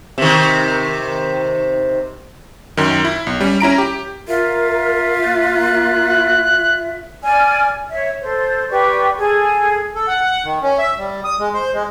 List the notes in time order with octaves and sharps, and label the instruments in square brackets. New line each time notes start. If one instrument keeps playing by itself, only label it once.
[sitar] C3 D#3
[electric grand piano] F#2 D#3
E4
B1
G3 C#4
C#4 E4 A#5 D7
G4
[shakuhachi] F4 [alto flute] A#4 [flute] E5
[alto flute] A#3 [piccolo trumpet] F#6
[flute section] D5 G#5 F6
C#5 E5
A4 C5
G4 B4 D5 C#6
G#4 A4
[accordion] A4
F#5
F#5
D#3
C#4
E5
G3
D#6
G#3
C5
G#3